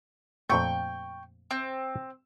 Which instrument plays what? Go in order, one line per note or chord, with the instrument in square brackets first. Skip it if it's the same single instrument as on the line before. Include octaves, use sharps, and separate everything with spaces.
[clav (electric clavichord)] F2 A#2 A3 [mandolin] G5 C#6
[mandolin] C4